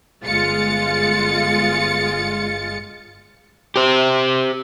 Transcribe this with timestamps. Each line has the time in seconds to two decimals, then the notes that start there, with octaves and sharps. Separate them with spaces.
0.24 G1 G#3 F4 A6 C#7
3.76 G4 C5